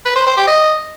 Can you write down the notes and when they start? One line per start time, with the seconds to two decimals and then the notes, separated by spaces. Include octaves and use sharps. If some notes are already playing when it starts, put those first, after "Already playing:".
0.05 B4
0.16 C5
0.26 C5
0.37 G4
0.47 D#5